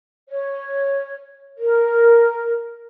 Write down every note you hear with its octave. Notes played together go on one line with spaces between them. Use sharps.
C#5
A#4